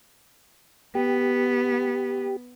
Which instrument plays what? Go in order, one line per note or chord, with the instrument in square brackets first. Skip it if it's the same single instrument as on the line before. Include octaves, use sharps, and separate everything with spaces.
[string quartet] B3 [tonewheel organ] G4